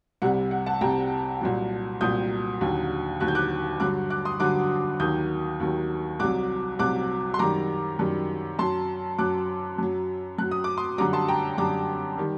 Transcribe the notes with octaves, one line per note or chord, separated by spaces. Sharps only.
C2 C3 G3 F#5
F#5
F#5 A5
C2 C3 G3 G5 A#5
C2 A#2 F#3
C2 A#2 F#3 D#6 G6
D#2 D3 F#3
D#2 D3 F#3 F#6
G6
D6 F#6
G2 D3 F#3 D6 F#6
D6 F#6
C6 D#6
G2 D3 F#3 D6 F#6
D#2 D#3 F#3 D#6 G6
D#2 D#3 F#3
C2 C3 F#3 D6 F#6
C2 C3 F#3 D6 F#6
C6
F#2 D#3 G3 A#5 D6
F#2 D#3 G3
F#2 F#3 A5 C6
F#2 F#3 D6 F#6
F#2 F#3
F#2 F#3 F#6
D#6
D6
C6 D#6
F#2 D3 G3 A#5 D6
A5 C6
G5 A#5
F#2 D3 G3 A#5 D6
D#3 G3